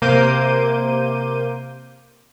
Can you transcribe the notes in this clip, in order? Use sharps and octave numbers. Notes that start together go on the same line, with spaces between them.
C3 A#3 C5 D6 G6 D#7